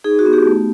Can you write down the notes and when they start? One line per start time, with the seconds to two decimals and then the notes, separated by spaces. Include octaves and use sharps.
0.04 D#4 G#4
0.19 F#4
0.26 B3
0.33 G4
0.46 A3